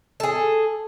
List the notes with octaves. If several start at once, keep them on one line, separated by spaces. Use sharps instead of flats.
G#4 A4